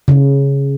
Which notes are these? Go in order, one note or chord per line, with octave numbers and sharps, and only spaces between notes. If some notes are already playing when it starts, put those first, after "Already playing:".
C#3